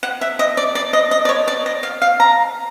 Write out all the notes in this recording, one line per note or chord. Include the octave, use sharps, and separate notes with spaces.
F#5
E5
D#5
D5
D5
D#5
D#5
D5
C#5
D5
D#5
F5
F5
A#5